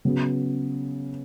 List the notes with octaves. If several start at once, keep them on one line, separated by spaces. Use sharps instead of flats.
C#3 F#3 B3